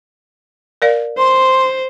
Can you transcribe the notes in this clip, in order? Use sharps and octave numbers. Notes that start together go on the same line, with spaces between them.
A#4 D5 F5
C5 C6